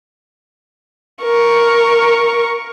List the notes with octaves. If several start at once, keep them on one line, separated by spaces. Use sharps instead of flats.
A#4 C#6